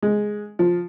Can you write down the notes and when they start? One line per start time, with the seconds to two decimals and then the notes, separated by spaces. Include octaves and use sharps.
0.02 G#3
0.59 F3